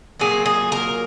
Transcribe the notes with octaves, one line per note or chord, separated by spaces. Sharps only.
A#2 F#3 A#3 G#4
G#4
A#4